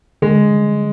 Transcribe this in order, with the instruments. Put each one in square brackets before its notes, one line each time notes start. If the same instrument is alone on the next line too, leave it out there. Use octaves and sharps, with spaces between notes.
[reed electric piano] D3 [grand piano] G#3